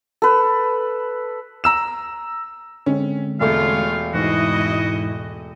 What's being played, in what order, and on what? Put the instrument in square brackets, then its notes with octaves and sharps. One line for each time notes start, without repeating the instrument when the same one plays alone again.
[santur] A4 B4
[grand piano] A#5 E6 E7
[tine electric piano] D3 G#3 C4 [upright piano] C#4
[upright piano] E1 A3 [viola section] F4 C#5 [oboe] F5
[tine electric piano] G#2 B2 E3 [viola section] E4 D#5 [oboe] F#4